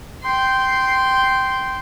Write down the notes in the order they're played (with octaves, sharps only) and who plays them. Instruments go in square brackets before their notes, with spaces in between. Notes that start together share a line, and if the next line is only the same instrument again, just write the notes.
[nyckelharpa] G5 C6